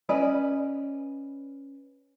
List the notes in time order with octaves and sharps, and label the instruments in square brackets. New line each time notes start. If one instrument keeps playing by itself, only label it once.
[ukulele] C#4 B4 D5 D#5